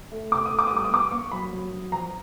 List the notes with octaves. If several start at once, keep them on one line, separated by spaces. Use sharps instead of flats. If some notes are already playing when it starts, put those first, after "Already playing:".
A3
C3 D6
D#6
A3
D6
D#6
G3 D6
D#6
B3 D6
A#3 C#6
F#3 B5
F#3
F#3
F3 A#5